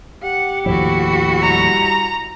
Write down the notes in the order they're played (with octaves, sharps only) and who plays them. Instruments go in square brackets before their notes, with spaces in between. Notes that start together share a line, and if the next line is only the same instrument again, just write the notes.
[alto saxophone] G4 [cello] F#5
[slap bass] D#2 A2 F3 [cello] E4 F#4
[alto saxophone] G3 [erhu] A#5